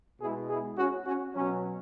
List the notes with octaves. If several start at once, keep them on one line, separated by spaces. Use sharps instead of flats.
B2 G#3 E4 G#4
E4 G#4
C#4 F#4
C#4 F#4
B2 F#3 C#4